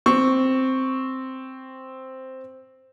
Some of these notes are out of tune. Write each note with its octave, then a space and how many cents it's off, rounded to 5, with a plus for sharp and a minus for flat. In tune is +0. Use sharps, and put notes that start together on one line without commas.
C4 +0 C#6 +0